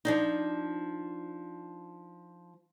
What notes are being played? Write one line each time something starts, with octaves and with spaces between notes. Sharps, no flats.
F3 D4 D#4